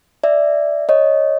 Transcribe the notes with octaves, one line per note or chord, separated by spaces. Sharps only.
D5 E5
C#5 D#5